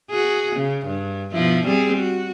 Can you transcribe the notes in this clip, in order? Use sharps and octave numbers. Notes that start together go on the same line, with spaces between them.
F#4 G#4
C#3
G2
B2 F3 E4
G3 C4 G#4
F#4